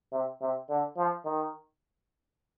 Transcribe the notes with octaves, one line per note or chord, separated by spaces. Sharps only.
C3
C3
D3
F3
D#3